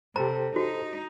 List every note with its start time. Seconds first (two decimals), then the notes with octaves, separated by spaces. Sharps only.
0.16 C3 G4 A4 C5 A#5
0.56 D#4 F#4